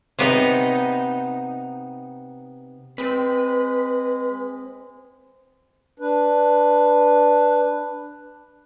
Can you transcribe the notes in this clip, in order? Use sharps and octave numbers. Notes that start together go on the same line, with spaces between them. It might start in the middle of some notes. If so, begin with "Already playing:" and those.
C3 B3 D#4
G#3 C4 B4
D4 B4